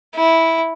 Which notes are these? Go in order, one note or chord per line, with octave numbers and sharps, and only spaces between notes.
E4